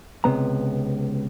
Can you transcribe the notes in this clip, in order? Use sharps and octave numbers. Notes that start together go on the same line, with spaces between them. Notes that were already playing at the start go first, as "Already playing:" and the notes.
C#2 C3 B3 A#5